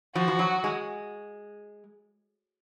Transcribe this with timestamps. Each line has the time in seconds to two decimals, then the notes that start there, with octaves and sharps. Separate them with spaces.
0.15 F3 F#4
0.28 F3
0.39 F#3
0.64 G#3